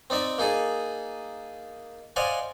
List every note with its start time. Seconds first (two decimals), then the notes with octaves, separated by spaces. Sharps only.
0.10 C4 D#4 D5 E5
0.38 A#3 D#4 G#4 A4
2.16 C5 D5 D#5 F5 F#5 G#5